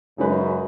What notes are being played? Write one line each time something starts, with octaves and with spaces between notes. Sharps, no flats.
F#2 C#3 G#3 D#4 G#4 B4